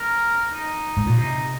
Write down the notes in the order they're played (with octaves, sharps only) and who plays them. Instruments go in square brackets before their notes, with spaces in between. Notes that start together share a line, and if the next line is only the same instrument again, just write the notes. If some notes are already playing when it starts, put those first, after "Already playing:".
Already playing: [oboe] A#4
D#4
[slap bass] G#2
A#2
[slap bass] C3 [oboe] D#4